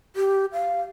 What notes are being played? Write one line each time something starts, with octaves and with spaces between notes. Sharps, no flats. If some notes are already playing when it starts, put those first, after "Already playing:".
G4
F5